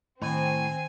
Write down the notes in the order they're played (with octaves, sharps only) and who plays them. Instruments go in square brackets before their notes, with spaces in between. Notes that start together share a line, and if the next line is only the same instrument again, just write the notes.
[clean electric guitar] A2 [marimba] D#3 [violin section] C4 [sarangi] G#5